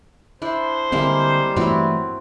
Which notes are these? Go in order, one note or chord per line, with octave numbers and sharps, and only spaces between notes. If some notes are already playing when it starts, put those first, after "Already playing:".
D4 E4 C5
D3 G3 G#3 A#3 C4 E4
G2 E3 F#3 A3 C4 E4